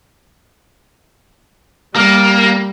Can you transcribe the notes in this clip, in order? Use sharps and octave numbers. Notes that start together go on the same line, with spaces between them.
G3 A#3